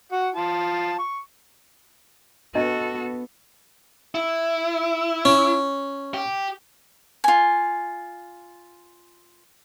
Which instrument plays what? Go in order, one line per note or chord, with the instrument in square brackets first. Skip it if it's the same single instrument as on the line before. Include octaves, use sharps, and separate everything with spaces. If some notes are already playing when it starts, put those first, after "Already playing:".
[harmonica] F#4 F#5
F4 A5
C#6
[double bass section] B3 [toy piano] D4 D#5 A5 [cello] F#4 A4
[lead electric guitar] E4
[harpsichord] C#4
[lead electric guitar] G4
[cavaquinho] F4 G#5